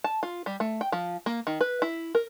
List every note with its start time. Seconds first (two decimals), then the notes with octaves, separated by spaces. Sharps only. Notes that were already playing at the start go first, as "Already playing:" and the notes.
0.04 A5
0.23 F4
0.46 G3
0.60 A3
0.81 G5
0.92 F3
1.26 A#3
1.47 D#3
1.61 B4
1.82 E4
2.15 A#4